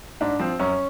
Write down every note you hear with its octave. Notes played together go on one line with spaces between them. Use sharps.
G#2 D4
F3 C4
F#2 C#4